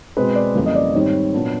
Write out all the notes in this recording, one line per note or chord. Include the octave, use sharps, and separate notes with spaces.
B2 G#3 C4 B4
D5
F2 C#3 E3 G3 A#3
D#5
D5
G#2 D#3 G3 C4 C#5
A#2 F#3 B3 D4